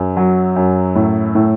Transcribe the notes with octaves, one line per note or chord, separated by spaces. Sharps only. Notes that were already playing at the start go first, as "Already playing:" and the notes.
Already playing: F#2
F#3
F#2
A2
A2